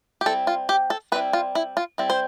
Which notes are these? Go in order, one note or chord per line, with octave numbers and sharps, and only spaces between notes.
G4
G3 C4 E4 A4
F4
G4
A4
G3 C4 E4 B4
F4
E4
F4
G3 C4 E4
C5